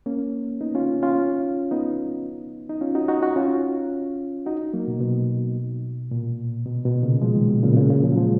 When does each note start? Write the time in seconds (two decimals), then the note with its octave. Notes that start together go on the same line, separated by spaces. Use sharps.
0.06 A#3 C#4
0.61 B3 D#4
0.75 C#4 F4
1.03 C#4 F4
1.71 B3 D#4
2.69 D#4
2.81 C#4 F4
2.95 D#4 F#4
3.08 D#4 F#4
3.22 D#4 F#4
3.36 C#4 F4
4.46 D#4 F#4
4.73 F#3 A#3
4.88 B2
5.01 B2
6.11 A#2
6.66 B2
6.85 B2
7.03 A#2 C#3
7.22 F3 G#3
7.35 D#3 F#3
7.49 B2
7.63 A#2 C#3
7.73 B2
7.77 A#2 C#3
7.90 A#2 C#3
8.04 C#3 F3
8.12 F#3
8.18 F3 G#3